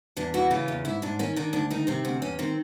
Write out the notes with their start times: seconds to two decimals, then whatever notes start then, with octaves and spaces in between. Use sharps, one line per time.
0.17 E2 D4
0.34 E3 F#4
0.51 C#3 F4
0.68 E2
0.85 G#2 E4
1.02 G#2 D4
1.19 D#3 C#4
1.36 D#3 D4
1.53 D2 D4
1.70 D#3 D#4
1.87 C3 C4
2.05 D2 C4
2.22 E2 C#4
2.39 D#3 C4